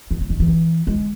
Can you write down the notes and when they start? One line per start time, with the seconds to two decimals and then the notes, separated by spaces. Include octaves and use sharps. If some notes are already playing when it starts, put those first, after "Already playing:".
0.11 D#3
0.20 C#3
0.30 D#3
0.40 E3
0.87 G#3